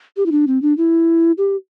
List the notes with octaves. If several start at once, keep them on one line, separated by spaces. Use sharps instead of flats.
G4
E4
D4
C4
D4
E4
G4